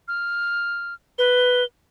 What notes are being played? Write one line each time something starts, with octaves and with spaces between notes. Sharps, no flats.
F6
B4 G7